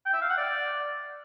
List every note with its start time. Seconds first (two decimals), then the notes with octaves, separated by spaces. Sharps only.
0.05 G5
0.13 E5
0.21 F5
0.29 F#5
0.37 D5